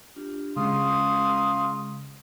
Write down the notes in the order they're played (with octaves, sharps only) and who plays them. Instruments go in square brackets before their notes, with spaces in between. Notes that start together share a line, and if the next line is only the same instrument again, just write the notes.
[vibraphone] D4 F4 G4
[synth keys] C#3 G#3 [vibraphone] C#4 C#6 [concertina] F4 [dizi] D#6